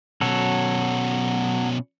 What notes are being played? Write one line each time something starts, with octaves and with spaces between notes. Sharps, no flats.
B2 F#3 C#4 A4